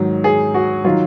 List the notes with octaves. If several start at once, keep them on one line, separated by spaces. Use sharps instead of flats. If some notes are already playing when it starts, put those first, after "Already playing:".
Already playing: G#2 D#3 F#3
G#4
F#4
D#3 F#3 F4